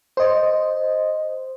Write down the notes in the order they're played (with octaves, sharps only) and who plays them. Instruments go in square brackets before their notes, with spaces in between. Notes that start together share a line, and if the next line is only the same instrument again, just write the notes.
[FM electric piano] C5 D#5